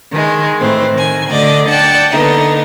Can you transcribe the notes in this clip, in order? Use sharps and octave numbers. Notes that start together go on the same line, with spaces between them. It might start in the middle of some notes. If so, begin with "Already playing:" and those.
D#3 G#3
A2 E3 C4
D#3 G#5
D2 D3 D5 D#5 D6
D5 F#5 G5 A5
D3 A#3 B3 D#4